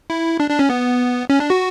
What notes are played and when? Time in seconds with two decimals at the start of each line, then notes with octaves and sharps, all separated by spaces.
0.10 E4
0.40 D4
0.50 D4
0.59 C#4
0.70 B3
1.30 C#4
1.40 D4
1.50 F#4